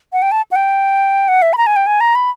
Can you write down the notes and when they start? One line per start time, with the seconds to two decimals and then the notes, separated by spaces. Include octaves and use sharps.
0.13 F#5
0.22 G5
0.32 A5
0.51 F#5
0.56 G5
1.28 F#5
1.42 E5
1.53 B5
1.58 A#5
1.67 G#5
1.76 G5
1.87 G#5
2.01 A#5
2.15 B5